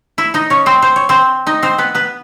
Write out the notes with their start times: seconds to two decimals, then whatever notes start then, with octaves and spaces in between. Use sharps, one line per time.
0.18 E4 E5
0.34 D#4 D#5
0.50 C#4 C#5
0.66 C4 C5
0.82 C5
0.96 C#5
1.09 C4 C5
1.47 D#4 D#5
1.62 C4 C5
1.78 B3 B4
1.95 B3 B4